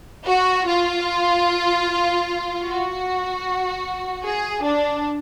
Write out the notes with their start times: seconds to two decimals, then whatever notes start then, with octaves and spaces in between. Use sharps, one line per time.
0.26 F#4
0.66 F4
2.65 F#4
4.24 G#4
4.63 D4